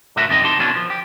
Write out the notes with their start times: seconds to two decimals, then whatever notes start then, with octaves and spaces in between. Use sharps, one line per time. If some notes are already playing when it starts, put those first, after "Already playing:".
0.16 A2 D3 A3 F#4 A#4 E5
0.28 C2 F#2 D3 C4 D#4 D#5
0.44 C2 D#4 G4 A5 C6
0.59 B2 D#3 E3 C#4 D4
0.75 F3
0.90 G4